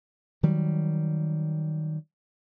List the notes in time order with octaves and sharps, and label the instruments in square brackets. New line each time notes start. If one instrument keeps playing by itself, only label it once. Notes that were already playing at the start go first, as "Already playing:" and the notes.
[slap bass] D#3 F#3 G3